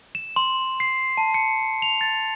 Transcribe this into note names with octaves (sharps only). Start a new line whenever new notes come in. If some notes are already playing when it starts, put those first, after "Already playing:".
E7
C6
C7
A5
C#7
F7
A6